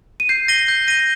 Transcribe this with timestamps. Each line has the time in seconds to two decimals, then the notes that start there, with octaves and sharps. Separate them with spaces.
0.20 D#7
0.29 G6 C7
0.48 A#6 D#7 G7
0.68 G6
0.88 A#6 D#7 G7